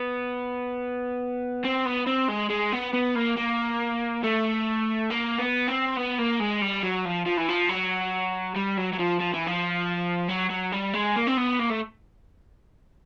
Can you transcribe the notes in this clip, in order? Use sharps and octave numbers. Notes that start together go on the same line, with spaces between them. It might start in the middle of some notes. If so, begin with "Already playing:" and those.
Already playing: B3
C4
B3
C4
G#3
G#3
B3
B3
A#3
A#3
A3
A#3
B3
C4
B3
A#3
G#3
G3
F#3
F3
F3
E3
F3
F#3
G3
F#3
F#3
F3
F3
E3
F3
F#3
F#3
G3
G#3
A#3
C4
B3
A#3
A3